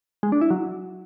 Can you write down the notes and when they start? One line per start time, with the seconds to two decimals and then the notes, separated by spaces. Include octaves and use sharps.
0.23 G#3
0.32 D4
0.41 E4
0.51 F#3